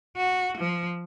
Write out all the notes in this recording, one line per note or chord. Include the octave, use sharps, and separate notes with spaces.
F#4
F3